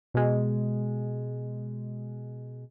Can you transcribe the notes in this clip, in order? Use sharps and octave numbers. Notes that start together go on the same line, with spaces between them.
B2 G#3